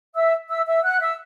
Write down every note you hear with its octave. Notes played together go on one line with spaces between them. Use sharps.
E5 E6
E5 E6
E5 E6
F#5 F#6
E5 E6